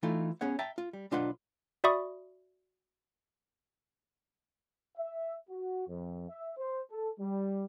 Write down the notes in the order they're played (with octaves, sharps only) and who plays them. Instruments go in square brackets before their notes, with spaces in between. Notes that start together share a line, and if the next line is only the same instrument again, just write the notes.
[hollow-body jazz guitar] E3 A3 D#4 F4 A4
B3 C#4 G#4 C#5 F#5
E5 G5 A5 A#5
F4
G3
B1 D4 F4 B4 D#5 F#5
[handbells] F#4 D5 E5 B5 C#6 D#6
[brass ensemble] E5
F#4
F2
E5
C5
A4
G3